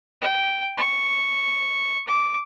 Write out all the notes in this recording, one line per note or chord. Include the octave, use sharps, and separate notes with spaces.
G5
C#6
D6